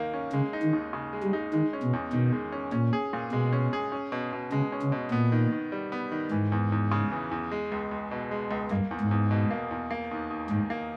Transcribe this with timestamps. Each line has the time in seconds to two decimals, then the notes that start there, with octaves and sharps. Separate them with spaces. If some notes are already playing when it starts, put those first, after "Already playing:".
Already playing: D#2 D#3 A#3
0.14 C#4
0.33 C#3 G#3
0.53 D#4
0.63 D#3
0.73 D#2
0.93 C#3
1.13 G#3
1.23 G3
1.33 D#4
1.53 D#3 G#3
1.73 C#4
1.83 B2
1.93 E2
2.13 B2 D#3
2.32 G#3
2.52 C#4
2.72 A#2 C#4
2.93 G#4
3.13 A#2
3.32 B2 G#3
3.53 C#4
3.73 G#4
3.92 C#4
4.12 B2
4.33 B2
4.52 C#3 G#3
4.72 C#4
4.83 C#3
4.92 B2
5.11 A#2 B3
5.32 D#3
5.52 D#3
5.72 G3
5.92 B3
6.12 D#3
6.32 G#2 E3
6.52 E2
6.72 E2
6.92 C#3
7.12 E3
7.31 E2
7.51 G#3
7.72 C#2
7.91 C#2
8.11 B2
8.31 G#3
8.51 C#2
8.71 G2 A#3
8.91 E2
9.01 G#2
9.11 E2
9.31 B2
9.51 A#3
9.71 E2
9.91 A#3
10.11 D#2
10.30 D#2
10.50 G#2 D#3
10.70 A#3